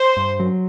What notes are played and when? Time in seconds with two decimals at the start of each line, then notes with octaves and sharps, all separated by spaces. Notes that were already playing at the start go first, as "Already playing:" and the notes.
Already playing: C5
0.17 G2
0.40 F#3